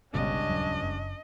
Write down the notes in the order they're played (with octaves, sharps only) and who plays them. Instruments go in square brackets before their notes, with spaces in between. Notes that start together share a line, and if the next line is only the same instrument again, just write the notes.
[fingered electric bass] G1 B2 [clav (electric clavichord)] C#2 G2 [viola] C#4 D4 [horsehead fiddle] D#5
[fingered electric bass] D#1 F#3
F#1